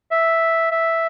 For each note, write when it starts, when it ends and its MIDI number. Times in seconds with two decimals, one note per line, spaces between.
0.11 0.69 76
0.71 1.07 76